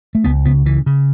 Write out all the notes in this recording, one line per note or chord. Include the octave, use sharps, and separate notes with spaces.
A3
C#2 B3
C#3 B3
C#3 E3
C#3